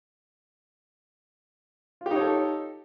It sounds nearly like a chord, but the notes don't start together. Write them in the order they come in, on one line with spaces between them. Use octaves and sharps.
F4 G4 D#4 C#5 A4